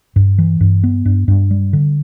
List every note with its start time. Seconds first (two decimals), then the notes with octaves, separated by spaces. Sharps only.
0.16 G2
0.38 E3
0.61 G2
0.84 B3
1.05 G2
1.28 G2
1.51 G3
1.73 D3